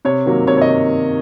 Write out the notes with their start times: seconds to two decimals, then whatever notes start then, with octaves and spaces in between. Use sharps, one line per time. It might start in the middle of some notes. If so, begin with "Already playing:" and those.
0.05 C3 C#5
0.26 D#3 F#3 A#3
0.47 C3 C#5
0.57 C#5
0.61 D#5
0.69 D#3